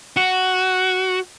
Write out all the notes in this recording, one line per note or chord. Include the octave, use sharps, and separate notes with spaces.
F#4